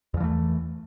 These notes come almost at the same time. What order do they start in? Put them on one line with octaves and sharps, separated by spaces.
E2 F3 E3 A3